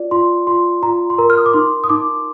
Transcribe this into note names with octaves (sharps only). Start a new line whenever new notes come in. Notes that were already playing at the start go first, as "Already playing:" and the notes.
Already playing: F4 D5
F4 C6
F4 C6
F4 A#5
C6
A#4 A#5
F6
D#6
D6
D#4 C6
D#6
D#4 D6